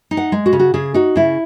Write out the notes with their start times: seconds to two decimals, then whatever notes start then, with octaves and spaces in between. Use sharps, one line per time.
0.11 D#4
0.17 F#5
0.32 G#3
0.46 F#4
0.53 C#3
0.59 F#4
0.74 C#3 G#4
0.94 D#4 F#4
1.16 C#3 E4